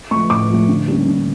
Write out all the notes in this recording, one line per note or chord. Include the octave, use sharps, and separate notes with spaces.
F3 A3 C#6
A2 D6
F3 A3
D3
G3 A#3 C#4
D3